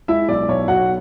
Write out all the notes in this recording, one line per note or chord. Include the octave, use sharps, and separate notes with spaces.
G#3 E4 E5
B1 D5
B1 C#5
B1 F#4 F#5